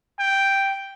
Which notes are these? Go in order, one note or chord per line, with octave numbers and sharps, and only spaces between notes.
G5